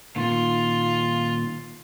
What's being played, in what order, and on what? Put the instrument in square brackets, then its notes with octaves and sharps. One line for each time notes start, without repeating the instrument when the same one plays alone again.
[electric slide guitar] A#2 D#3 [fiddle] F4